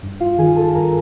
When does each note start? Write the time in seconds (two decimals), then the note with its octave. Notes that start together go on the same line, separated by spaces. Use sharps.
0.03 G2
0.20 G2 F4 F5
0.38 D#3 G#4 G#5
0.56 D#3 A4 A5
0.75 G2 A#4 A#5